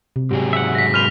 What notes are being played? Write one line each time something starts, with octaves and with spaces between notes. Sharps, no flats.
C3
G#2 F#3 G4 G#4
E5 F#5
A#6 B6
A#3 B4 C5 F6 F7